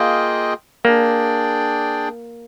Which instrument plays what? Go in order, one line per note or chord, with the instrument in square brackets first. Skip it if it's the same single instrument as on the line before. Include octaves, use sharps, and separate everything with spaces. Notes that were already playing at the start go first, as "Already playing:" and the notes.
Already playing: [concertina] A#3 F4 G#4 D#5 G5
[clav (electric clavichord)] A#3 [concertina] D4 G#4 D5 G5